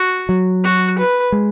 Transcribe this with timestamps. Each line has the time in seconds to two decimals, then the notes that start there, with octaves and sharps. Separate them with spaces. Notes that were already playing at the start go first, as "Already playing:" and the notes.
Already playing: F#4
0.29 F#3
0.64 F#4
0.99 B4
1.32 G#3